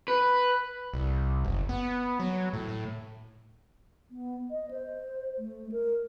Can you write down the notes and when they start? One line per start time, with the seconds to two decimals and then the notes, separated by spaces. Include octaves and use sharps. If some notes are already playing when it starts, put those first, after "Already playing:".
0.08 B4
0.94 C2
1.45 F#1
1.69 B3
2.20 F#3
2.53 A2
2.68 A2
4.11 B3
4.51 D#5
4.71 C5
5.38 A3
5.72 A#4